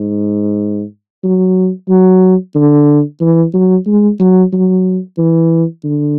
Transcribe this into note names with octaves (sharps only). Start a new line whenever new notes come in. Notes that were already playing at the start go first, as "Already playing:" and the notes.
Already playing: G#2
F#3
F#3
D3
E3
F#3
G#3
F#3
F#3
E3
D3